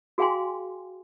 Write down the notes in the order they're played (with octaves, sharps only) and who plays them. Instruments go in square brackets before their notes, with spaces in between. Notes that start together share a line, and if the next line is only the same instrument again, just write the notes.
[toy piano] F#4 G#4 F5 G5 G#5 C6